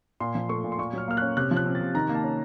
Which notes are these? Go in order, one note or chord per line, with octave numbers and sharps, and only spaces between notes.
A#2 C6
F3
A3 C#6
A#2
C6
A#2 C#6
F#3 F6
A#3 F6
C#4 F#6
C3 F#6
F3
F#6
C4
A6
C3
D#3 A#5
A#3
A5
C#4